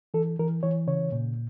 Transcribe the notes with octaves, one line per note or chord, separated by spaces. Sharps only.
E3 A4
E3 A#4
E3 C#5
C#3 C#5
A#2